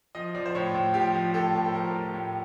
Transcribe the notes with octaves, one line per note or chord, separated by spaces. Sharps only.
F3 D#5
F3 D5
C5
A2 C#5
A2
F3 G4
F3
A2 A4
A2
A4
F3 A#4
F3
A2